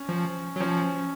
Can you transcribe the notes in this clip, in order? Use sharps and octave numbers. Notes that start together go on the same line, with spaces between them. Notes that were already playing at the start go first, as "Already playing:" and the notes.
Already playing: C#4
F3
F#3
F3 C#4